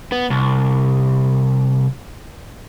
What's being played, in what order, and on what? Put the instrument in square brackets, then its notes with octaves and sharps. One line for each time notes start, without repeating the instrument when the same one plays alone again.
[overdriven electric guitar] B3
C2